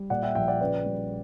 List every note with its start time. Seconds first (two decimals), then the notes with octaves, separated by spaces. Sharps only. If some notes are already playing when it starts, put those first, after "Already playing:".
Already playing: G3
0.10 A#2 D5 F#5
0.23 E5 G5
0.35 A#1 E5 G5
0.48 D5 F#5
0.61 C#3 B4 D5
0.86 G3